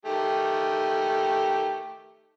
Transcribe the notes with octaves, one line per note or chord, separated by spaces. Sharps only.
D#3 A3 G4